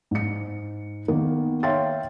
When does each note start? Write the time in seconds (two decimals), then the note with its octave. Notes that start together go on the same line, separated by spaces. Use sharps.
0.11 G#2 C#7
1.08 D#3 A#3 B3
1.63 C#5 E5 F5 G5 C6 A6